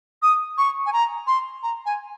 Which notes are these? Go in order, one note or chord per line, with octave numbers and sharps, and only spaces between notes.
D#6
C#6
G#5
A#5
C6
A#5
G#5